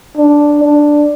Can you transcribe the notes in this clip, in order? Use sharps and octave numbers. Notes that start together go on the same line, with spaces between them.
D4
D4